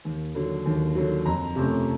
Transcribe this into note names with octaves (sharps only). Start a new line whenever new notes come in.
D#2
D3 F#3
D#2
D3 F#3
F2 A#5
C3 F3 A3 C#4